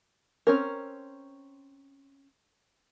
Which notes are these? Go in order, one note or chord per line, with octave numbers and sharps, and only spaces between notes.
C4 C#4 A#4